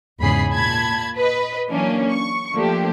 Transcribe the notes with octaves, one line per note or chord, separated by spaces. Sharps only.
E2 G#2 C#3 G#4 B5 C7
A#2 A5 B5 G#6
B4 D#5
E3 F#3 A#3 C#4 D4
C#6
F3 A3 A#3 D4 G4